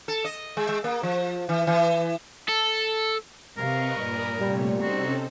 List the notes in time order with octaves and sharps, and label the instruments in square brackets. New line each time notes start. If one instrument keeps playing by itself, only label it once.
[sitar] A4
D#5
G#3
G#3
A#3
F3
E3
E3
[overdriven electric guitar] A4
[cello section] C3 F5 [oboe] A#4 [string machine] B4 D#5 C#6
[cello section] G2 A#2 [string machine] D5 B5 D#6
[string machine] C3 A3 C#5 [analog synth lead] G3
[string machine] C3 C#4 A4 [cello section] C4 D#4 [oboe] F#4